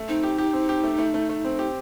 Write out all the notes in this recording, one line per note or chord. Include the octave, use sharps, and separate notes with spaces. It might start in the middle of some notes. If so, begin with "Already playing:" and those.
Already playing: A3
C4 D#4
G4
G4
C4
G4
A3
A3
A3
A3
C4
G4